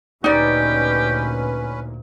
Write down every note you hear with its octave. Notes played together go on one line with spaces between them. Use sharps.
D2 A#2 C#4 D#4 G4 B4 D5